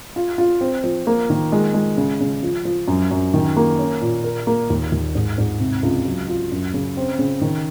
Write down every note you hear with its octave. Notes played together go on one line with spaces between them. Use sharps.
F4
F4
C4
F3
A#3
D#3
G#3
G#3
C#3
C#3
F3
F3
F#2
F#2
D#3
A#3
C#4
A#2
A#4
A#3
D#2
D#2
G#2
G#2
C3
C#2
F#3
F4
F#2
C#3
C4
C#3
D#3